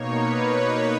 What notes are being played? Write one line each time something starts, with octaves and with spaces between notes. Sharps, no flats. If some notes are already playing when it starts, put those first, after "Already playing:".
Already playing: B2 A#3 D#4 C#5
B4